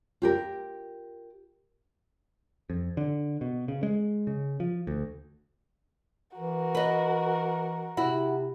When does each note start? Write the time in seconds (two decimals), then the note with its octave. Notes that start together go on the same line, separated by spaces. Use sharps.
0.22 F4 G4 A#4
2.70 F2
2.97 D3
3.41 B2
3.68 C#3
3.83 G#3
4.27 C#3
4.60 F3
4.87 D2
6.37 E3 F#4 A#4
6.75 B4 D#5
7.97 C3 E4 F#4